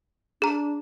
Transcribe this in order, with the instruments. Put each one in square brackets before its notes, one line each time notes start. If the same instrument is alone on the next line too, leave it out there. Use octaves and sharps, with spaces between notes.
[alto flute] D4 [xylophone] G#4 A#5